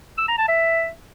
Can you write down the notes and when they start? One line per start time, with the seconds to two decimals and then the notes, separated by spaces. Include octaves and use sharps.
0.18 E6
0.28 A#5
0.38 A5
0.48 E5